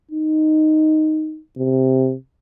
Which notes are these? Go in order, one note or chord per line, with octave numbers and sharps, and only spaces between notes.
D#4
C3